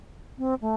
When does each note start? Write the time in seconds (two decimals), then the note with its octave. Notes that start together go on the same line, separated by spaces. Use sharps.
0.38 C4
0.61 A3